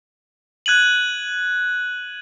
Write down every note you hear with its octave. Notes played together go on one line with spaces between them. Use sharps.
F#6 G#6 D#7 F#7